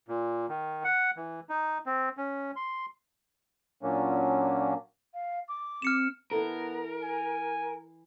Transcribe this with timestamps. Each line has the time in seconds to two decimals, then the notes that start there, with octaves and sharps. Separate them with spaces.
0.08 A#2
0.49 D#3
0.84 F#5
1.17 E3
1.49 D#4
1.86 C4
2.17 C#4
2.56 C6
3.83 A#2 F#3 A#3 C#4 D4
5.14 F5
5.48 D6
5.82 C4 F6 C#7 E7
6.31 E3 B3 E4 A4 A#4
7.02 G#5